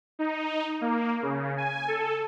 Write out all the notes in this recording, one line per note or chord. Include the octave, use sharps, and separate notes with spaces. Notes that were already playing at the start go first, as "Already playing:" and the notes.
D#4
A#3
C#3
G#5
A4